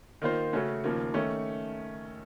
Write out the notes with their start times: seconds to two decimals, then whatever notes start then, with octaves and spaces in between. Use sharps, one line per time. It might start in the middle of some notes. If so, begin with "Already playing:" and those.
0.22 D#3 A#3 F4 C5
0.53 C#3 A3 C#4 F#4
0.84 D#2 C#3 F3 A#3
1.14 D#3 A3 C#4